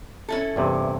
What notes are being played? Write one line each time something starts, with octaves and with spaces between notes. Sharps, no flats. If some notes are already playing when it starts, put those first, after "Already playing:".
C#4 E4 A4
E2 G2 C3